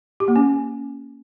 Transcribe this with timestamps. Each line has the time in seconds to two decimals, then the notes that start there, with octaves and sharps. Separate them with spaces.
0.20 G4
0.28 A#3
0.36 C#4